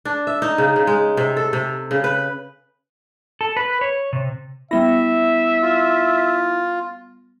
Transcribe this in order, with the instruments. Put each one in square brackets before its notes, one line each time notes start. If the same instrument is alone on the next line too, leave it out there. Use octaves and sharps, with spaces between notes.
[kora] D4
E5
D#4
C#3
C#3
G#3
C3
A4
C3
C#3
B4
[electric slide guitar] A4
B4
C#5
C3
[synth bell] G3 B3 A#6 [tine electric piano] E4 [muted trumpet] E5
[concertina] F4